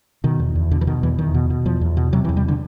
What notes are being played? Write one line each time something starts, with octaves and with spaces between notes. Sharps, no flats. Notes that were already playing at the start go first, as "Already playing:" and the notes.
B2 D#3
E2
E2
B2 D3
E3
B2 D#3
E2 E3
E2 D#3
B2
B2
E2 F3
E2
B2
C3 F#3
E3
E2
G3
D3